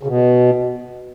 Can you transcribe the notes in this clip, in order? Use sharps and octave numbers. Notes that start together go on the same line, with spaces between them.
C#3
B2